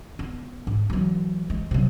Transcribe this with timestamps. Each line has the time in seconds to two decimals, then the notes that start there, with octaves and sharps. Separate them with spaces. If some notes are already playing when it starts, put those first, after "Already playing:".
0.19 B3
0.67 G#2
0.90 E3 F#3
1.50 G#3
1.71 C3 F#3